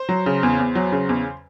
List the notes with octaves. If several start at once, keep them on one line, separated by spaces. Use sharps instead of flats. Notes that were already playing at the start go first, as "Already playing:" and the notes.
Already playing: C5
F#3
C#3
E2
E2
F#3
C#3
E2